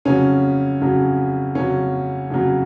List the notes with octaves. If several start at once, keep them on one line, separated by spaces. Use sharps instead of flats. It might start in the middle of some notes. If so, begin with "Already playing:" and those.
F2 C#3 F#3 C#4
F2 C#3 F#3
F2 C#3 F#3 C#4
F2 C#3 F#3